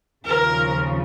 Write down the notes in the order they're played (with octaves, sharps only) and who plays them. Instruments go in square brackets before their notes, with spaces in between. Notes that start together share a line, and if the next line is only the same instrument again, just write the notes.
[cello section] D#2 C#3 F3 [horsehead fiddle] A#4